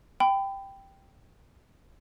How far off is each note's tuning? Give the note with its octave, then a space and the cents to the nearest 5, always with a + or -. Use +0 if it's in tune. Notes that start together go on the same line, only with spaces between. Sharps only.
G5 +0 B5 +30